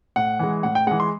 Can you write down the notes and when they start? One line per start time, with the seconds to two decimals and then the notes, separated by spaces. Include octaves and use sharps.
0.16 A2 F#5
0.39 E3 G#3
0.63 A2 F#5
0.75 G5
0.87 G#3 F#5
0.91 E3
1.00 C6